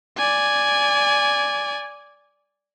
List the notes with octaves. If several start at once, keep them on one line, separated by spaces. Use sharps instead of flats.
D5 G#5